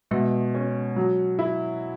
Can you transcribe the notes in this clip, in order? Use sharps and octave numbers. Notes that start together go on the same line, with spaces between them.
B2 G#3
C#4
F#3
E4